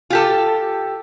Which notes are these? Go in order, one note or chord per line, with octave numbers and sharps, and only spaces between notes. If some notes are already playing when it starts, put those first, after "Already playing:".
F4 G4 A4